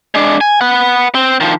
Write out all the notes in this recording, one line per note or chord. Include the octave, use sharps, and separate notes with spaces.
G#3 D4
G#5
B4 F#5
C4
D#3 F3